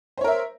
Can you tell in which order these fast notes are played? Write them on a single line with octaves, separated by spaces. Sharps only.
C5 C#5 A#4 E5